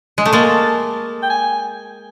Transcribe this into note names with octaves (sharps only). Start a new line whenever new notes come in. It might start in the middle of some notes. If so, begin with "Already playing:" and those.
G#3
A3
G#3 A#3 A5
G5
G#5